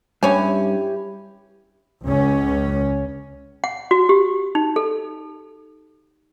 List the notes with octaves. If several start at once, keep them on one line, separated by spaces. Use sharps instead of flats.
G2 C#4 E4 G4 C#5 G#5
C#2 C#4
F#5
F#4
G4
D#4
A4